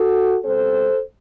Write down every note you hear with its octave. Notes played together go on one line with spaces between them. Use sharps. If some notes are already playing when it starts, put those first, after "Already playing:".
Already playing: F#4 A4
B2 G3 C4 A4 C5